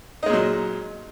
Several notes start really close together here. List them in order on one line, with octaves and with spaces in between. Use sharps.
D#4 G#3 A#2 F#3